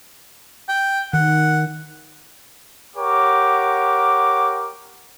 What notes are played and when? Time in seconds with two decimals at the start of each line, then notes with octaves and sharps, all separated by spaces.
0.68 G5
1.13 D#3 F#5
2.97 G4 A#4 C#5 F#5 D6